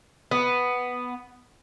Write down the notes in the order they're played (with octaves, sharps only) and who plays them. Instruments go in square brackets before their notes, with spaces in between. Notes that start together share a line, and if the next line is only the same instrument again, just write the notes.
[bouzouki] B3